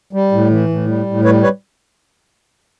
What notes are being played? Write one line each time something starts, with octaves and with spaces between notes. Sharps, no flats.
G3
A2
E3
A2
G3
A2
G3 B4 C#5
B4 C#5